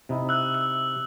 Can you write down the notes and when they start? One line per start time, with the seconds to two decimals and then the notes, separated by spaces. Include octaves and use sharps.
0.09 C3 D#4 E4
0.29 E6 F#6
0.54 E6